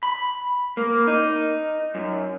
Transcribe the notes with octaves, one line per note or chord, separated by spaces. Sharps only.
B5
A#3
D#4
F#2